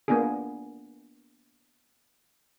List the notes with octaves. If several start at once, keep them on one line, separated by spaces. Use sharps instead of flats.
A#3 B3 D4 F4 G#4